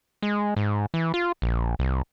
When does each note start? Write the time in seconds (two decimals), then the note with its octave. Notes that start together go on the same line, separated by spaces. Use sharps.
0.23 G#3
0.56 G#2
0.94 E3
1.14 F4
1.42 A#1
1.79 C2